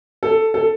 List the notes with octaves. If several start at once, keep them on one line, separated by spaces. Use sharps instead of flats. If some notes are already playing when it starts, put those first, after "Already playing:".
A4
A4